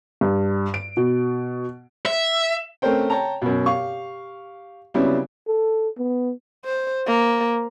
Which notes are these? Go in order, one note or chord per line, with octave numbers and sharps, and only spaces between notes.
G2
D7
B2
E5
A3 C4 C#4 A#4 C5 G5
C#5 G5 A5 A#5
F#2 B2
G4 F5 C#6
C#3 F#3 G3 B3 C4 E4
A4
B3
C5
A#3